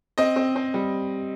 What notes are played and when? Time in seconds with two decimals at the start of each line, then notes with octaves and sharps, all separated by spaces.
0.18 C4 D#5
0.36 C4
0.56 C4
0.74 G3